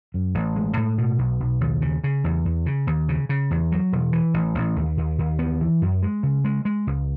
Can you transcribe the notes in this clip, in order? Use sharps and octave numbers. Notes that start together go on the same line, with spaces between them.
F#2
A1
G#3
A2
B2
B1
B1
D#2
C#3
C#3
E2
E2
C#3
D#2
C#3
C#3
E2
F#3
E1
E3
A1
A1
D#2
D#2
D#2
B3
E3
F#2
G#3
C#3
G#3
G#3
C#2